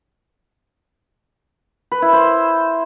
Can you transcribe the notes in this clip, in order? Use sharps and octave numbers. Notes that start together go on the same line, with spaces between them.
B4
E4
C5